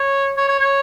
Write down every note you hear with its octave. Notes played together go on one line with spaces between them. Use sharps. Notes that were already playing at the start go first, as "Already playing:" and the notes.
Already playing: C#5
C#5
C#5
C#5